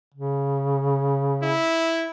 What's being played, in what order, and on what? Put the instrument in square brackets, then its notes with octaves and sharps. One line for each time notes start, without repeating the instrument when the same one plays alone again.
[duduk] C#3
[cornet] E4